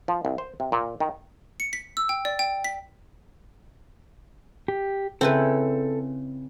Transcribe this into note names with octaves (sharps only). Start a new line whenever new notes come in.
F3
C2
C5
C3
A#2
D#3
C#7
B6
E6
G5
D5
G5
B6
G4
C#3 C4 E4 A4 B4